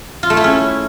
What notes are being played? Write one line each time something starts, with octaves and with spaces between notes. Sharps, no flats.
F4
A3
E4
C#4